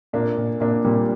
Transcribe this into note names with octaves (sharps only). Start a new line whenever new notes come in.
A#2 A#3 D4
A#2
A#2 A#3 D4
A#2 G3 A#3